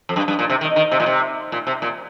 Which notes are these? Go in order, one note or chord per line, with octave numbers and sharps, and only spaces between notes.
F2
G2
G2
A#2
C3
D#3
D#3
C3
A#2
C3
A#2
C3
A#2